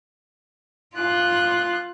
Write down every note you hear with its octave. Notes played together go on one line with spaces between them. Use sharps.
F4 F#6